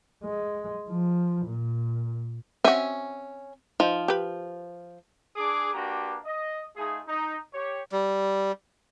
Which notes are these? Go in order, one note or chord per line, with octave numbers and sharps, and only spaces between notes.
G#3
F3
A#2
C4 C#4 F#4 E5 G#5
F3 D#4
G4 B4
D4 G#4 D6
A#3 D4 F#4 G4 B4 A#5
D#5
A3 D#4 F4 G#4
D#4
G4 C#5
G3